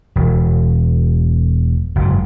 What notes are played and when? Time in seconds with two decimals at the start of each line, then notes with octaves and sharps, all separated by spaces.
0.16 E1
1.95 F#1 G#2